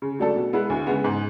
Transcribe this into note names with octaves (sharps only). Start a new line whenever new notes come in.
C#3
F#3 A3 D4 A4
B2
G#3 B3 E4 B4
D2
C#3 G#3 B3
G#2